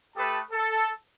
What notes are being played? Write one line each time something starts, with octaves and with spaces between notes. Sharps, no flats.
A3 G4 A4 B4 A5 D#6
A4